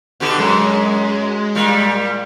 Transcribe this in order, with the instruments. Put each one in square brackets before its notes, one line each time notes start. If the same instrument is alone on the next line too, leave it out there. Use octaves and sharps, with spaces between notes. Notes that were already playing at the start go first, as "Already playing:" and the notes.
[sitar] B2 D3 G4
[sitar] F#2 [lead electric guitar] G#3
[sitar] A#2 G3